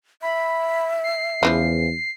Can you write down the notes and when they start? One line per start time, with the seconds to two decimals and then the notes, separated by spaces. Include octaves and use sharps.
0.22 E5 B5
1.04 C7
1.43 E2 C#3 E3 F3